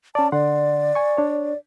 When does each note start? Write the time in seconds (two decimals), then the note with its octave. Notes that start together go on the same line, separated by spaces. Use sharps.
0.15 C#4 D5 A5
0.32 D3 D5 F#5 C6
0.95 G#5 C#6
1.17 D4 C#5